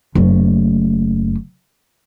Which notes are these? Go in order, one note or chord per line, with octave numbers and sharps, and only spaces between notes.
F#1 A3